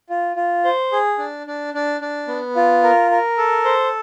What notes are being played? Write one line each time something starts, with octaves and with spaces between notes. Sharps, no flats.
F4
F4
C5
G#4
D4
D4
D4
D4
B3
F4
A#4
A#4
A4
C5